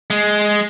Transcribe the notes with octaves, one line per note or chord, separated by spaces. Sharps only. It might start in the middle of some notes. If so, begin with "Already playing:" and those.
G#3